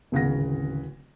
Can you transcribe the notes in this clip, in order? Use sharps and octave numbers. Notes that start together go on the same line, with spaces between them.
D1 G#1 C#3 G#4 F#5 A#6